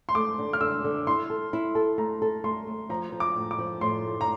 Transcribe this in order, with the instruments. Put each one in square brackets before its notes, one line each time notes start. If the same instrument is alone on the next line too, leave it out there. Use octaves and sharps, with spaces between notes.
[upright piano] C6
[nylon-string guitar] A3 [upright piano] D6
[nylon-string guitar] D3
[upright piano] F6
[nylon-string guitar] D3 [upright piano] E6
[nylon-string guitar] D3
[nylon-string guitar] E4 [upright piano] C6
[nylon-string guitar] A4
E4
A4
[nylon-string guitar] A3 [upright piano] A#5
[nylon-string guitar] A4
[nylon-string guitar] A3 [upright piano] C6
[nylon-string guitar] A3
[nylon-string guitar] F3 [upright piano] A#5
[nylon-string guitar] F3
[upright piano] D6
[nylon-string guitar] A2
[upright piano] D6
[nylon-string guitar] F3
[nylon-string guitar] A2 [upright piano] C6
[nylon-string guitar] A3
[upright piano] A#5